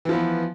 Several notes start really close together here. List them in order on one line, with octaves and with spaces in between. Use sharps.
E3 F3 B3